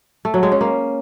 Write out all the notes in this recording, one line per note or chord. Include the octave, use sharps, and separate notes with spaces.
A3
F#3
G#3
C#4
A#3